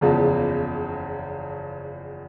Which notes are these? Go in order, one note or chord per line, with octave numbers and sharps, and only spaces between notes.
F#1 E2 C#3 F3